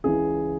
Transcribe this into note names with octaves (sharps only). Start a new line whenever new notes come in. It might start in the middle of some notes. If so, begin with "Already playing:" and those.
C#2 C#3 E3 G#4